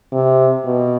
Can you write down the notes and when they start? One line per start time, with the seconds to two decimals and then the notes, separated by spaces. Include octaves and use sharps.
0.13 C3
0.65 B2